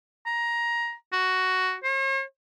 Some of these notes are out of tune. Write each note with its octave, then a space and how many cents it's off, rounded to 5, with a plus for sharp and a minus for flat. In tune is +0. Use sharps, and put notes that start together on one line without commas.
A#5 +15
F#4 +5
C#5 -45